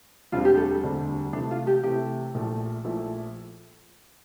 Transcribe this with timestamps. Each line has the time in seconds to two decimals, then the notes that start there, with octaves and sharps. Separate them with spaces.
0.32 E1 D2 D3 G3 C4 F4
0.45 G4
0.57 A4
0.83 E1 D2 D3 G3 C4
1.33 C3 E3 A3 D4
1.51 F4
1.67 G4
1.83 C3 E3 A3 G4
2.34 A#1 A#2 F3 A3 E4
2.84 A#1 A#2 F3 A3 E4